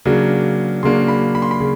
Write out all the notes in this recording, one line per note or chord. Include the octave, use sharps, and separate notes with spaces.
C#3 F#3 A#3 D4
C#3 F#3 A#3 D4 C6
B5
B5
C6
B5
C#3